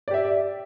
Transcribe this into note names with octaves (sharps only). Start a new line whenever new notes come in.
G4 D5 E5